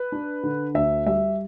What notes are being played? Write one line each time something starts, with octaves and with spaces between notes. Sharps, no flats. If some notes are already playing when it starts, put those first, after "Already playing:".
Already playing: B4
D4
D3
D2 E5
G3 E5